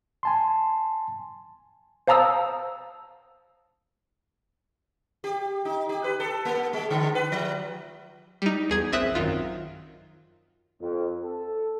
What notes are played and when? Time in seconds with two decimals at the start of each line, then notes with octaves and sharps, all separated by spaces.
0.23 G#5 A5 C6
2.07 C5 F5 A5 A#5 D#6 E6
5.24 G4
5.65 D#4
5.89 G4
6.04 B4
6.20 A4
6.45 A#3
6.73 G#3
6.90 D3
7.15 B4
7.32 F3
8.42 G3 D#4
8.70 E2 G#4 G#6
8.92 A#1 C4 E5 D#6 F#6
9.15 F#2 D#3 F4
10.80 F2
11.22 A4